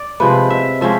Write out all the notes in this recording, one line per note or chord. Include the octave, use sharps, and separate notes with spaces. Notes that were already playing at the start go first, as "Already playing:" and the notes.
Already playing: D5
C3 F3 G#3 C4 B4
E5
F3 G#3 C#4 E5